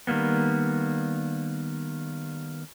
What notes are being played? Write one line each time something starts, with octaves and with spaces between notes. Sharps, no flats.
D#3 G3 A#3 B3